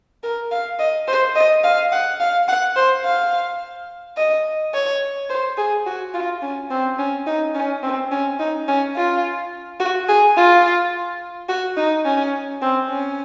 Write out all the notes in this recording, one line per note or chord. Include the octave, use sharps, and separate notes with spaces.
A#4
F5
D#5
C5
D#5
F5
F#5
F5
F#5
C5
F5
D#5
C#5
C5
G#4
F#4
F4
C#4
C4
C#4
D#4
C#4
C4
C#4
D#4
C#4
F4
F#4
G#4
F4
F#4
D#4
C#4
C4
C#4